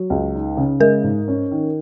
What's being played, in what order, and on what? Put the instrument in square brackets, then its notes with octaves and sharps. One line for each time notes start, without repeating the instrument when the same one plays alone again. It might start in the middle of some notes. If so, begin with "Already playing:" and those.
Already playing: [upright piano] F#3
C#2
D#4
C#3
[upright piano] G#3 [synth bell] A#4
[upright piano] G#2
C#4
D#3